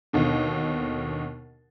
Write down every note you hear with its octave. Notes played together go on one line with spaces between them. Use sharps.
D#2 B2 D3